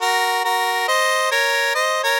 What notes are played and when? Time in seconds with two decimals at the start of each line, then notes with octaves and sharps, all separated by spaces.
0.01 F#4 A#4
0.45 F#4 A#4
0.88 C5 D#5
1.31 A#4 C#5
1.75 C5 D#5
2.03 A#4 C#5